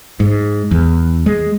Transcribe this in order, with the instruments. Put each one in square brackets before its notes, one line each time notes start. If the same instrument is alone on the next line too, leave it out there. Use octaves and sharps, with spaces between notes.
[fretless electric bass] G#2
E2
G#3